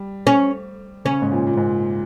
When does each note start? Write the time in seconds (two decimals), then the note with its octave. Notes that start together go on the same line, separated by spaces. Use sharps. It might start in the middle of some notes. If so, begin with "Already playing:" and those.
Already playing: G3
0.27 C#4
1.05 C#3 C#4
1.22 G#2
1.32 A#2
1.47 A#2
1.57 G#2